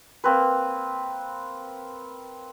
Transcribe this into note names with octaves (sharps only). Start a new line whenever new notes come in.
A#3 C4 B4